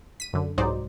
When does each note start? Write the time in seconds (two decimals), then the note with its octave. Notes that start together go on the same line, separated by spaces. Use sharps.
0.20 B6 D#7
0.33 F#2 D3
0.58 C2 G#2 F#3 D#4 C5 D5